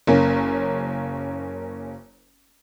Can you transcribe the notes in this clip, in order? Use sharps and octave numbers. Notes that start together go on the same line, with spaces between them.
F#1 A#3 C#4